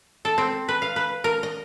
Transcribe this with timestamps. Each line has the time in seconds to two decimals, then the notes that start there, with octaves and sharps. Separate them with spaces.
0.25 A4
0.38 C4
0.69 B4
0.82 F5
0.96 B4
1.24 A#4
1.43 D#5